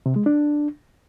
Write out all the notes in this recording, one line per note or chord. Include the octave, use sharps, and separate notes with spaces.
C3
G#3
D4